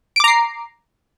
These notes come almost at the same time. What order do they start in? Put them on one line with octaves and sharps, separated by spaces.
D7 D6 A#5 C7